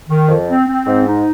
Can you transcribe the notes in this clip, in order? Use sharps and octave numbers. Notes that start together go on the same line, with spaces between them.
D#3
F2
C4
C4
G#2
D#4